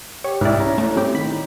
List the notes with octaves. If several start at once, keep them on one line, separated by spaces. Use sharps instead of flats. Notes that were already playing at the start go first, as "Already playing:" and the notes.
G4 C#5
C2 G#2 E4 D5
C#4 A#5
A2 A3
G3 C4 G4
D#3 B5 B6